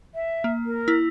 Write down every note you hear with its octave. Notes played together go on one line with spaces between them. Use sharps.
E5
A#3
A#4
E4